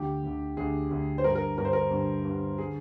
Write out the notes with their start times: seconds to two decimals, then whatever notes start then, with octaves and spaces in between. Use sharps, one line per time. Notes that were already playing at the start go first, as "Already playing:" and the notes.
Already playing: D2 D3 G4
0.23 D2 D3
0.57 D2 D3 G#4
0.91 D2 D3
1.18 C5
1.24 G2 D3 A#4
1.35 A#4
1.58 G2 D3 A#4
1.65 C5
1.73 A#4
1.91 G2 D3
2.25 G2
2.30 D3
2.58 D3 G#4